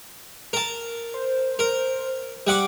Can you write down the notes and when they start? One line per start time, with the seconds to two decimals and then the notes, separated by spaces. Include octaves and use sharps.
0.53 A#4 A5
1.14 C5
1.59 A#4
2.47 G3 F#5 D6